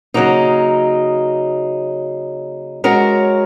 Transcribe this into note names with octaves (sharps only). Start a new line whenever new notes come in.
C#3 F#3 A#3 D#4
G#3 C#4 F#4 A#4 C#5